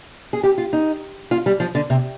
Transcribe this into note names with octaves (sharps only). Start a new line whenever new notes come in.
G#4
G4
F4
D#4
F4
G3
F3
D3
C3